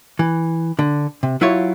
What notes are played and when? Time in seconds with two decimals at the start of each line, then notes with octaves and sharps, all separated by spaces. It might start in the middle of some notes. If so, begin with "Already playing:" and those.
0.19 E3
0.79 D3
1.23 C3
1.41 F#3 E4 F4 C#5